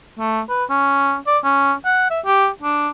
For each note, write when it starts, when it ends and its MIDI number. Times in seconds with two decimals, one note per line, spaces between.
0.18 0.41 57
0.49 0.64 71
0.70 1.16 61
1.27 1.38 74
1.44 1.73 61
1.85 2.09 78
2.10 2.20 76
2.25 2.48 67
2.63 2.89 62